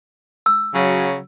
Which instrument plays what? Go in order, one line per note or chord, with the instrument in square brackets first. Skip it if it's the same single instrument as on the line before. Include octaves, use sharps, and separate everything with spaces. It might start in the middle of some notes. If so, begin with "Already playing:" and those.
[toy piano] E6
[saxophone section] C#3 F#3